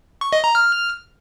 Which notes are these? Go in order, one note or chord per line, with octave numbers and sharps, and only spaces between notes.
C#6
D#5
A#5
F6